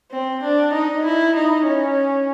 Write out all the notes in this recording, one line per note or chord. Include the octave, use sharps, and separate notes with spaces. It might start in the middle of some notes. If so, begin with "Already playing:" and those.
C4
D4
D#4
E4
D#4
C#4